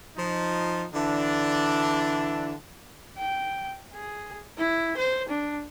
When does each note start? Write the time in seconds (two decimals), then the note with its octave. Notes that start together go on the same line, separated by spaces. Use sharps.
0.17 F3 D#4
0.94 D3 E3 D4
3.18 G5
3.93 G#4
4.57 E4
4.97 C5
5.29 D4